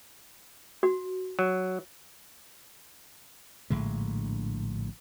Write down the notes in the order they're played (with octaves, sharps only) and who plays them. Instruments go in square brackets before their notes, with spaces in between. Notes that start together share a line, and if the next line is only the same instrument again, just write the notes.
[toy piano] F#4
[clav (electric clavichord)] F#3
[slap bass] A#1 A2 D3 G#3